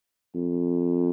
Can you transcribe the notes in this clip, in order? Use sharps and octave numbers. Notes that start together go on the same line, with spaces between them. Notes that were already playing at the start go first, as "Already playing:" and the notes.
F2